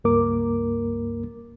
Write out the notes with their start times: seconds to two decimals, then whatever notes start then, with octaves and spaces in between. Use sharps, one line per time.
0.04 C#2 G2 A#3 A#4 D6